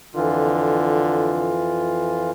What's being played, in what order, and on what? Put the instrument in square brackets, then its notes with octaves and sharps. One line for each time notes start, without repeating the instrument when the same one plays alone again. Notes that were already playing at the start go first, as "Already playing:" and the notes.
[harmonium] F2 E3 F4 [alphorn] D3